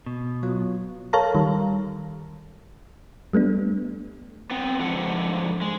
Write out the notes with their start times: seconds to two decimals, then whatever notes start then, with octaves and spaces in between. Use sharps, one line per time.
0.06 B2
0.43 F#3 B3 F4
1.13 A4 A#4 C#5 F5 A5 A#5
1.35 D#3 G3
3.33 G3 A3 B3 D4
4.50 B3 C4
4.80 G#2 D3 F3 A4 F#5
5.61 G#3